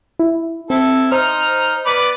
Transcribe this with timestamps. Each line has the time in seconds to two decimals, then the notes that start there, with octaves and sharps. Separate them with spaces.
0.19 E4
0.70 C4 E4 A4
1.12 D#4 C5 A#5 F6
1.86 B3 D5 B5